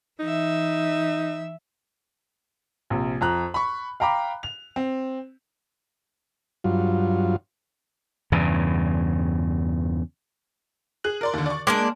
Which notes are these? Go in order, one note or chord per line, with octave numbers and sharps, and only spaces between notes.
E3 D#4 E5
A#1 C3
F2 A#5 F#6
B5 C#6
F5 G5 A#5 B5 D6
F7
C4
G2 F#3 F4
E2 G2 C#3
G#4 F#6 F#7
A#4 D5 C6
D#2 D3
D5 C#6
G#3 A#3 D4 D6